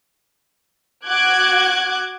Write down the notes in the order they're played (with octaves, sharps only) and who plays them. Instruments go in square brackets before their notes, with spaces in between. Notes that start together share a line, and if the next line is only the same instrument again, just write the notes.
[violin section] F#4 D6 F#6 G#6